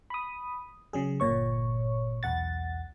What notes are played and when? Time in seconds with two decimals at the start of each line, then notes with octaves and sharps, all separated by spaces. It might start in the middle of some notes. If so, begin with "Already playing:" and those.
0.10 B5 D#6
0.93 C#3 F#3 G#4
1.20 G1 A#2 C#5 C#6
2.23 B1 E2 F#5 A6